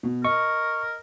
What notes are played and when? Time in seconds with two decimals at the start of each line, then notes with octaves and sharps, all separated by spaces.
0.03 B2
0.25 A#4 D#5 C#6